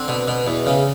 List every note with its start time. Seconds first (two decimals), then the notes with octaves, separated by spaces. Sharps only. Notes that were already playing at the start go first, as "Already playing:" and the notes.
Already playing: D3 C4 D4
0.08 B2
0.28 B2
0.47 E2
0.66 C#3